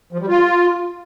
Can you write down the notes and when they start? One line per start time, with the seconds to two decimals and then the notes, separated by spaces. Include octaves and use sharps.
0.13 F3
0.20 G3
0.28 F4